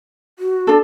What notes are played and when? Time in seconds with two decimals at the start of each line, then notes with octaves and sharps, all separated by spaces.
0.39 F#4
0.67 D4 A4